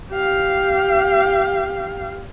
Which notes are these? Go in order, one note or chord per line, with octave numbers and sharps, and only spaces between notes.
G4 F5